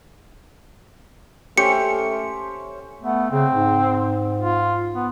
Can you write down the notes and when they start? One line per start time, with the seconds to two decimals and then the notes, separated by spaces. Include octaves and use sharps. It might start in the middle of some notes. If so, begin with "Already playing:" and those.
1.57 A3 C#4 G4 C5 E5 C#7
3.01 A3 B3
3.31 C#3 C4
3.53 G#2
4.38 F4
4.95 B3